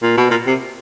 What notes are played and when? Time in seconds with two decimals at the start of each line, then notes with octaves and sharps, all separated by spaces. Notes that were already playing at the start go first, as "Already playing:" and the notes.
0.02 A#2
0.17 B2
0.30 A#2
0.46 C3